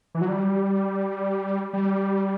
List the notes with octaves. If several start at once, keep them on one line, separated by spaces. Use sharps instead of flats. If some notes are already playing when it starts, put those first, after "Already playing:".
E3
F#3
G3
G3